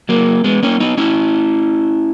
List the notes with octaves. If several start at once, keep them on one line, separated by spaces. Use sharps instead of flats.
F#3 A#3
G#3 B3
A#3 C#4
B3 D#4
C#4 E4